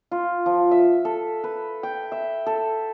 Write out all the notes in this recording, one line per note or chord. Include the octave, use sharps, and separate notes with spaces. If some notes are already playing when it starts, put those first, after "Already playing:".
F4
F3
E5
A4
B4
G5
E5
A4